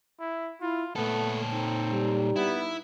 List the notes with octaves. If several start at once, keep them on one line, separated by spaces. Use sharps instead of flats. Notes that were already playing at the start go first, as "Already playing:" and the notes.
E4
E4 F4
A#2 A3 B3 A4
C4 D#4
G3
B3 E4